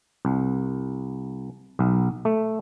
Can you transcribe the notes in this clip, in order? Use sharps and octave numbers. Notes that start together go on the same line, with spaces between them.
C2
B1
A3